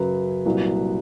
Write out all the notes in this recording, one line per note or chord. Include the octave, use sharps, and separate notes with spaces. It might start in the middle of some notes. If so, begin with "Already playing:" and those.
Already playing: F#2 C#3 F#3 B4
C2 A#2 F#3